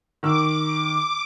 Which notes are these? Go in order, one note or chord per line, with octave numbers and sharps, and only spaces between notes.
D#3 D6 E6